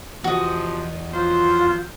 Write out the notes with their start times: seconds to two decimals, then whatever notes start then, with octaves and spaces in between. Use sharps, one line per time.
0.24 E2 C3 F3 F#4 D#5
1.13 F3 F#3 F4 C5